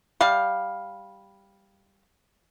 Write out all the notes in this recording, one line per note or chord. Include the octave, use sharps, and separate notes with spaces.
G3 F5